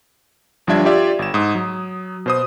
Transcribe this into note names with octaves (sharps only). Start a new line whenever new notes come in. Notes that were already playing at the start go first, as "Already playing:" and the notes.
G1 F3 G3 D4 E5 G#6
F4 G4 D5 E5
G1 E7
G#2 D#6
F#3
B2 C5 D#6